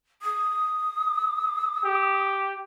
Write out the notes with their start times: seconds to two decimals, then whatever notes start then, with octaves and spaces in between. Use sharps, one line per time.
0.22 D#6
1.85 G4